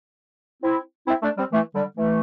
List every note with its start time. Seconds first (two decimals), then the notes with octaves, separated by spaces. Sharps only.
0.63 C4 E4
1.07 C4 E4
1.22 A3 D4
1.37 G3 C4
1.52 E3 A3
1.75 D3 G3
1.97 E3 A3